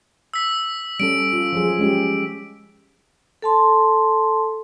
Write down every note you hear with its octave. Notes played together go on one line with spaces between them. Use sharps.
E6 B6
G3 C#4 A4 D7
F4
F3 F#3 G#4
G#3 C#4 G4
A4 A5 C6